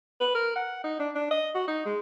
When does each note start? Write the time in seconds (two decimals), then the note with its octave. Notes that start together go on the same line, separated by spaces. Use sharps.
0.20 B4
0.35 A#4
0.56 F#5
0.84 D#4
1.00 D4
1.15 D4
1.31 D#5
1.55 F#4
1.68 D#4
1.86 G#3